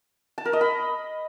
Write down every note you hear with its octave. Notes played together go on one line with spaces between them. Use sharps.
A5
A#4
D#5
B5